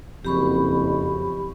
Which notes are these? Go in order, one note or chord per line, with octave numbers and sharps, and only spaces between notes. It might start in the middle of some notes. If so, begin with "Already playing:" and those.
F#1 F2 G4 B5 C#6